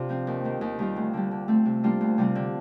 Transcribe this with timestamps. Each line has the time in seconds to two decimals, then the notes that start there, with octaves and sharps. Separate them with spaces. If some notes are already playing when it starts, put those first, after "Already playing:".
Already playing: C3 D4 F4
0.09 F3 C4
0.27 D#2
0.44 D#3 A#3
0.61 D#2
0.79 D#3 G3 A#3 F4
0.96 D2
1.13 D3 G3
1.31 D3
1.48 A3 C4
1.65 C3
1.83 G3 A#3 D4 F4
2.01 D2
2.18 C3 G3 C4
2.35 D3